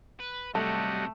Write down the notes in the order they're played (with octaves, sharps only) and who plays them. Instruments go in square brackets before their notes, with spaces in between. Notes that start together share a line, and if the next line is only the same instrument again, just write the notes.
[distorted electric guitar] B4
[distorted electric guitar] C3 F#3 [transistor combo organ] G3 D#5 F#5 [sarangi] A3 [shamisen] A4